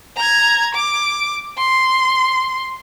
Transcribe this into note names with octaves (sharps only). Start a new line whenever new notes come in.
A#5 G#6
D6
C6